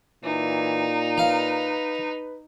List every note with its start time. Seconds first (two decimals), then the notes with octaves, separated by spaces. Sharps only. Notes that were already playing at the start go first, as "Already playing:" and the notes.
0.24 A#2 E3 D#4
1.18 B4 F5 A#5